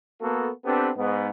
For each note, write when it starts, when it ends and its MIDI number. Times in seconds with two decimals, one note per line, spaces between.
0.21 0.49 58
0.21 0.49 59
0.21 0.49 66
0.21 0.49 69
0.65 0.90 59
0.65 0.90 60
0.65 0.90 62
0.65 0.90 67
0.65 0.90 69
0.65 0.90 71
0.97 1.30 44
0.97 1.30 59